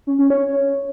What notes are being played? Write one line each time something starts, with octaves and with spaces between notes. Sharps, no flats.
C#4
C#4
C#5